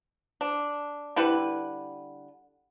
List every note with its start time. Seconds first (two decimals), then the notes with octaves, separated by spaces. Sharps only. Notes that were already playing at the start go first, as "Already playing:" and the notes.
0.41 D4
1.16 D3 G3 E4 B4